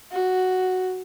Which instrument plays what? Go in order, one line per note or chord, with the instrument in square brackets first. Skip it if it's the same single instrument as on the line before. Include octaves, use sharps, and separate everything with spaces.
[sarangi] F#4